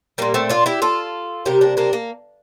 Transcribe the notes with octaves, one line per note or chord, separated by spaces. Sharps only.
A#2 G3 A#3
A3 C4
D4 F4
E4 G4
F4 A4
C3 G3 G4 A#4
A#3 D4
A#3 D4
A#3